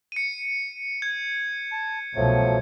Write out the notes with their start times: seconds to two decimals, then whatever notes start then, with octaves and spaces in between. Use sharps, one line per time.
0.12 C#7 D#7
1.02 G#6
1.72 A5
2.16 C2 B2 F3 F#3 A3